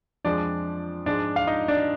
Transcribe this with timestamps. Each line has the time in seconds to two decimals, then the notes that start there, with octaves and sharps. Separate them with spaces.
0.25 F2 F3 G#3 D4 D5
1.06 G#2 F3 G#3 D4 D5
1.36 F5
1.47 D#4 D#5
1.68 D4 D5